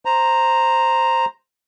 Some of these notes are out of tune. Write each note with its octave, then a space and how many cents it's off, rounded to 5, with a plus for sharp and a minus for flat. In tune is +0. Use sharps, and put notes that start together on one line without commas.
C5 +0 A#5 +0